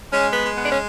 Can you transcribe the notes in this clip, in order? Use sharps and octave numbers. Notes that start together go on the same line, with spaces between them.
G#3 C#4
B3
G#3
B3
D4
C#4